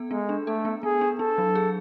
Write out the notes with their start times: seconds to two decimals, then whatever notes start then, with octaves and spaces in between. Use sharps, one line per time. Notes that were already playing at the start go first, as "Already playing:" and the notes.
Already playing: B3 A4
0.11 G#3 B3
0.29 D4
0.47 A3 A4
0.65 B3
0.83 B3 G#4
1.01 D4
1.19 D4 A4
1.38 F#3
1.55 G#4